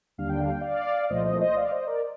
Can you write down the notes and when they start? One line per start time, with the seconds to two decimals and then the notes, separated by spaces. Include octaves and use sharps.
0.18 D#2 D3 G3 D4 F5
0.29 G5
0.40 F5
0.50 G5
0.61 D5 F5
1.10 C2 A#2 F3 A3 C5 D#5
1.25 C5 D#5
1.41 C5 D#5
1.56 D5 F5
1.71 C5 D#5
1.86 A#4 D5